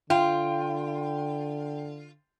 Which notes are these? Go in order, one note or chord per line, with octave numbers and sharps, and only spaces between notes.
D3 F4 G5